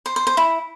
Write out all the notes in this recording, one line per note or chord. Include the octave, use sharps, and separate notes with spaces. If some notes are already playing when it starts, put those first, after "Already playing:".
C5
C5
C5
E4